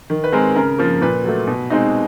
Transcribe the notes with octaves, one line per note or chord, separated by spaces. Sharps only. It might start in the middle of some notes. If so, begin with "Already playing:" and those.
D#3
B4
G#3 C4 A#4
C#3 A#4
F3 A#3
A#2 B4
F#3 A3
B2
G#3 C4 D#4